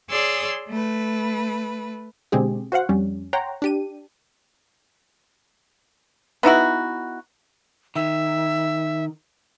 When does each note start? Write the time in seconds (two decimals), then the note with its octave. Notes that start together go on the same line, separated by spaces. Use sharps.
0.10 G#4 C#5 D5 C6 E6
0.69 A3 B4
2.32 B2 D3 G#3 C4 G4 G#4
2.72 F#4 C5 F5 F#5
2.89 F2 G3 C#4
3.33 C#5 F#5 G5 A#5 C6
3.62 D4 G4 D#7
6.43 B3 D#4 E4 F#4
7.95 D#3 E5